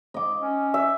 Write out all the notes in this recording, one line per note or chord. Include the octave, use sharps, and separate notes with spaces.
D#5 D6
C#4
E5